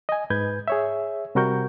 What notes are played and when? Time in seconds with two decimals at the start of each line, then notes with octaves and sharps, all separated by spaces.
0.09 D#5 G#5
0.30 G#2 B4 G6 G#6
0.68 G#4 C#5 E5
1.35 C3 G3 F#4 A#4 C#6 G6